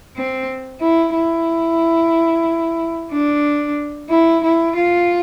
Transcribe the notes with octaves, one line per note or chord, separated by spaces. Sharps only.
C4
E4
E4
D4
E4
E4
F4